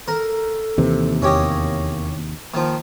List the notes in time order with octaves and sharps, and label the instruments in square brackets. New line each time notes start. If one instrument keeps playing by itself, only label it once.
[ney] A4 [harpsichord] A#4
[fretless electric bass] D#2 C3 [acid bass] E3
[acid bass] E2 [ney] A#3 [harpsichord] C#4 G4 D#5
[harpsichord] D#3 F3 [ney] A#3